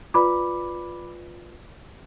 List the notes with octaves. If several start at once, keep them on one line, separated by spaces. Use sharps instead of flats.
F4 B4 D5 B5 D6